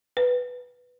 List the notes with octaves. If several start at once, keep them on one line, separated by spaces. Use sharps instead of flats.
B4